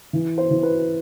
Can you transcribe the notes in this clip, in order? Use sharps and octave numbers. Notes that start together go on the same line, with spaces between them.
E3
C5
E3
B4